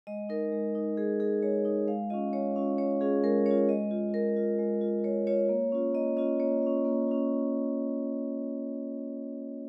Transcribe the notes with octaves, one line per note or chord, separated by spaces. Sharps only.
G#3 D#5
D#4 A#4
G#3
D#4
G#3 G#4
D#4 G#4
G#3 C#5
D#4
G#3 F5
C#4 F4 D#5
G#3 C#5
C#4 F4
G#3 C#5
C#4 F4 G#4
G#3 A#4
C#4 F4 C#5
G#3 D#5
F4
G#3 A#4
F4
G#3
F4
G#3 C#5
F4 C#5
A#3
C#4 F4
A#3 D#5
C#4 F4 D#5
A#3 C#5
C#4 F4
A#3
C#4 F4